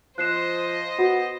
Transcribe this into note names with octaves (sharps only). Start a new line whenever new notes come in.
F3 C5 D#5 F#6 C7 E7
B3 F#4